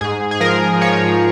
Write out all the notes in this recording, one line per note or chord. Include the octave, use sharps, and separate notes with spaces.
G#2 G#4
G#4
F3 A#4
F3 C#5